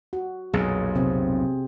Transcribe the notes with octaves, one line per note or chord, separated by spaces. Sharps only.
F#4
B1 F2 A#2 G#4
C3 C4